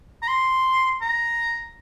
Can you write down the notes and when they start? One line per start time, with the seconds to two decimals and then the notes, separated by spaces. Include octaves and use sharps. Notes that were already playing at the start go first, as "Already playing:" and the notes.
0.22 A#5
0.28 C6
1.01 A#5